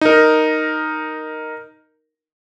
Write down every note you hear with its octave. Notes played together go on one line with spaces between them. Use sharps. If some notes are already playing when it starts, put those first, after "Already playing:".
D#4 A#4